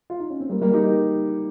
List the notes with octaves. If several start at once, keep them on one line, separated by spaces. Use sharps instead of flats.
F4
D#4
C#4
C4
G3 A#3
G3 A#3
D#4 G4